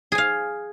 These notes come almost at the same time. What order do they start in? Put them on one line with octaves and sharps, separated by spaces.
G#4 G#5 F5